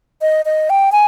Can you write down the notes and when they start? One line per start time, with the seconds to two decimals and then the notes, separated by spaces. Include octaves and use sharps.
0.22 D#5
0.45 D#5
0.70 G5
0.92 G#5